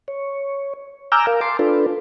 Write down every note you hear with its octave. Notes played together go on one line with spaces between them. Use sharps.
C#5
G#5 A#5 D6 E6 F6 G6
A#4 F5
A5 C6 D6
D4 F4 A4 B4